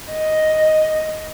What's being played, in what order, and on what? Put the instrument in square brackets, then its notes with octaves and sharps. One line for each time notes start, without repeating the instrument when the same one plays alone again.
[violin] D#5